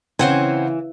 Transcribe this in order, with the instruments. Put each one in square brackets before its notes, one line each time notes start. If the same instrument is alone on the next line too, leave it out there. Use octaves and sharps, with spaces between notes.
[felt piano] C#3 [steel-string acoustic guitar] E3 [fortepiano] C4 C#4 [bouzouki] C5 F#5 G#5